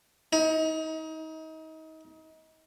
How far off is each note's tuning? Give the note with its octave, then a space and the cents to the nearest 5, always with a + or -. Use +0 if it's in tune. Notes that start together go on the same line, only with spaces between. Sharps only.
D#4 +30